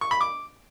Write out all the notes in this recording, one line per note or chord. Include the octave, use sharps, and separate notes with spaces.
C#6
B5
D6